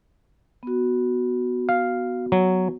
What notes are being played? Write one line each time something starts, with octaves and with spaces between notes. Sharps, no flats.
B3 F#4
F5
F#3